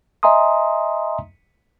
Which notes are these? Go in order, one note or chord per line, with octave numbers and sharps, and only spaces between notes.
D#5 E5 G#5 A#5 C6 D#6